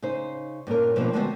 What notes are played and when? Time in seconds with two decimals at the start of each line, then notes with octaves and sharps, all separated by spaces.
0.02 C#3 D#4 C5
0.67 G2 A#2 C#4 A#4
0.96 B2 F3 A3 A#3 C4 D4
1.13 D3 G#3 B3 C4 D4 F#4